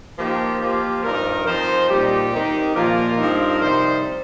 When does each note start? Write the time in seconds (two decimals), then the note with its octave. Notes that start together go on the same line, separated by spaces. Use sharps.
0.18 F3 A#3 D#4 G4
0.61 F3 A#3 F4 G4
1.04 G2 F3 D#4 A#4
1.46 F3 C4 D#4 C5
1.89 A#2 G3 D#4 G4
2.32 D#3 C4 D#4
2.75 A#2 F3 A#3 F4 A#4
3.18 G2 F3 C4 D#4
3.60 C3 G3 D#4 C5